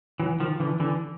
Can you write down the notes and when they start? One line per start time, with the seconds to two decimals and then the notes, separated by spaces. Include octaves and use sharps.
0.20 E3 F#3
0.40 D#3 F3
0.60 D3 E3
0.80 D3 E3